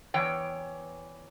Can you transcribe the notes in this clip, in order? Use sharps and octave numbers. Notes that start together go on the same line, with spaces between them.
E2 E3 C#5 G5